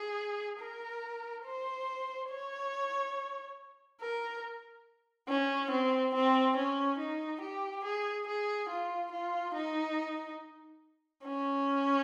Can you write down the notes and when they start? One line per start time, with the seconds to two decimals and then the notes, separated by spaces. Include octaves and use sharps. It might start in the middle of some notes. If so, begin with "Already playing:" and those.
Already playing: G#4
0.60 A#4
1.46 C5
2.31 C#5
4.01 A#4
5.28 C#4
5.71 C4
6.14 C4
6.56 C#4
6.98 D#4
7.41 G4
7.84 G#4
8.27 G#4
8.69 F4
9.12 F4
9.54 D#4
11.24 C#4